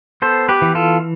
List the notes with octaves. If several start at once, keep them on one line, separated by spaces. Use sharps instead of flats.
B3 A4 C5
G4 B4
E3
F4 A4